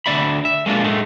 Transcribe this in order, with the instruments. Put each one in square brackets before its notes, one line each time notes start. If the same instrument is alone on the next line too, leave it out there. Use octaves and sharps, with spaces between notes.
[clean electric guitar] D2 D3 D5 E5 B5
E5
G#3 A#3 D4 F4
A2 G#3 A3